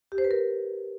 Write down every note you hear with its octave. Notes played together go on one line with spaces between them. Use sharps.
G4
C5
B4
A#4